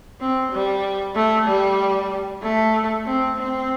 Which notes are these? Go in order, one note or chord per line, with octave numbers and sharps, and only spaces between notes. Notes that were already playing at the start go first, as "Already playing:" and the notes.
C4
G3
A3
G3
A3
C4
C4